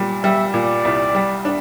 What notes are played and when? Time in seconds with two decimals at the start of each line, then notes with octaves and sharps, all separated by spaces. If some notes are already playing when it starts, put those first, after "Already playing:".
Already playing: A#2 G3
0.23 G3 E5
0.54 A#2 D5
0.85 C2
1.15 G3
1.45 D4